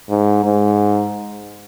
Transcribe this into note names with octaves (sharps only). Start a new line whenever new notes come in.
G#2
G#2